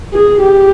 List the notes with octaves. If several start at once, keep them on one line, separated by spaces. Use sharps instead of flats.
G#4
G4